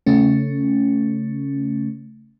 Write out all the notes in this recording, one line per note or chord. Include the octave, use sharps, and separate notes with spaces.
C#3 A3 C#4